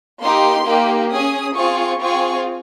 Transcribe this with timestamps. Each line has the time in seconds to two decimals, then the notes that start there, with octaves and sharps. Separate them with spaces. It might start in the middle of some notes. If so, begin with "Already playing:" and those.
0.20 A#3 D#4 G4 C6
0.65 A#3 D#4 G4
1.10 C#4 G#4 D#6
1.55 C4 F4 G#4 C#6
2.00 C4 F4 G#4 C#6